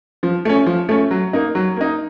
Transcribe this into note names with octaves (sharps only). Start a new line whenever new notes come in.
F3
A3 C#4
F3
A3 C#4
F#3
A#3 D#4
F#3
A#3 D#4